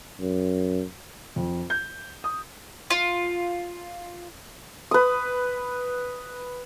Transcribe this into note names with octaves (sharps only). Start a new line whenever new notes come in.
F#2
F2
G6
D#6
F4
B4 D#6